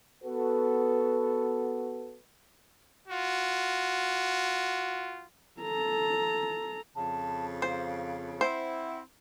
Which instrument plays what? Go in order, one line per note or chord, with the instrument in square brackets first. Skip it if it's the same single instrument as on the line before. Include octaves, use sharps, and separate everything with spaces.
[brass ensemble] B3 F#4 A4 B4
[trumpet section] F4 F#4
[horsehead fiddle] A4 A#5
[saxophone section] F2 C#3 F3 [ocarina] A5
[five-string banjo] C5 [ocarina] F5
[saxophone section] C4 E4 [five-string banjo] C5 [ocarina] F#5